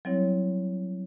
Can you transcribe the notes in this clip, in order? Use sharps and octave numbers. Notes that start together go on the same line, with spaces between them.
F#3 G3 C4 E4 C#5